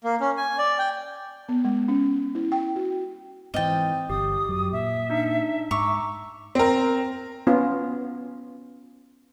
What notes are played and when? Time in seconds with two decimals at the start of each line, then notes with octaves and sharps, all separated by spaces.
0.04 A#3
0.20 C#4
0.37 G#5
0.58 D5
0.79 G5
1.49 B3
1.65 G#3
1.88 C#4
2.35 E4
2.52 G5
2.76 F#4
3.54 G#2 E3 C4 C5 D#5 G5 A6
4.10 G1 G4 D#6
4.49 F#2 F#3
4.73 A#2 E5
5.10 D4 D#4
5.71 G#2 A#5 C#6 D6 E6
6.55 C4 A#4
7.47 B3 C#4 F4